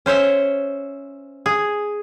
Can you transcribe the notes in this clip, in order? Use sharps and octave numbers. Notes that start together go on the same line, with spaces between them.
C#4 C5 C#5 E5
G#4